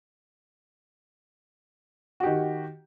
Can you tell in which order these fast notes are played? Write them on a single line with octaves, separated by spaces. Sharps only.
F#4 G4 D#3